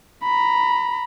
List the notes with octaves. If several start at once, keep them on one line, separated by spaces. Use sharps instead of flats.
A#5 B5